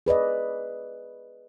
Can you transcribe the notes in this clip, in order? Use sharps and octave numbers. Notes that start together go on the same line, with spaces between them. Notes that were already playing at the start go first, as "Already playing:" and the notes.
G#4 B4 D5 D#5